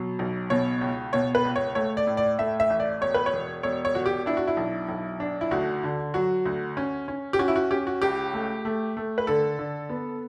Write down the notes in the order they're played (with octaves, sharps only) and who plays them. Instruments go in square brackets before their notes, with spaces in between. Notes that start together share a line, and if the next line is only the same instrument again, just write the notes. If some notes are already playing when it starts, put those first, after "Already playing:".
Already playing: [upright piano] B2 F#3
B1
B2 C#5
C#2
B2 C#5
B4
C#2
C#5
A3 C#5
D5
A2
D5
A3 E5
E5
A1
D5
E1 C#5
B4
C#5
E1
E1 C#5
C#5
E1 F#4
G4
D4 E4
F#4
E4
B1
B1
D4
E4
D2 F#4
D3
F#3 F#4
D2
C#4
C#4
G4
C#4 F#4
E4
F#4
C#4 G4
F#4
C#2 G4
A3
A3
A3
B4
D3 A4
D3
B3